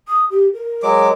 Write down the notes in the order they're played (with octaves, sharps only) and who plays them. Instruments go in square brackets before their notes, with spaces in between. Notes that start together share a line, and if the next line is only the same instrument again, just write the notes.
[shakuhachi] D#6
G4
A#4
[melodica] F#3 G#3 D6